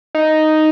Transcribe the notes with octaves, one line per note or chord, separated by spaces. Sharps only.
D#4